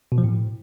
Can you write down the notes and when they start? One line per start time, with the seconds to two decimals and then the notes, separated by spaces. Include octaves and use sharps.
0.12 B2
0.18 F3
0.24 A2